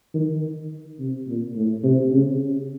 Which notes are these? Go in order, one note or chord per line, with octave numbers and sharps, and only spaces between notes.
D#3
C3
A#2
A2
C3
C#3